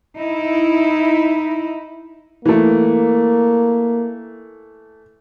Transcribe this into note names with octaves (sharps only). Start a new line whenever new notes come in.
D#4 E4
E3 A3 A#3